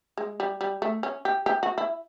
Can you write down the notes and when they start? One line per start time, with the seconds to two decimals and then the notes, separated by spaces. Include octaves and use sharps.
0.18 G#3
0.40 G3
0.61 G3
0.82 A3
1.03 C#4
1.25 G4
1.46 G4
1.63 F#4
1.78 E4